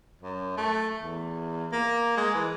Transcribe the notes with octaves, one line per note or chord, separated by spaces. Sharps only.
F#2
A3
E2
A#3
G#3
E3